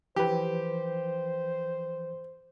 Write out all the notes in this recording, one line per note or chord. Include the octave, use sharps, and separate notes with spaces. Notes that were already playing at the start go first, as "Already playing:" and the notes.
E3 F3 G4 B4 C5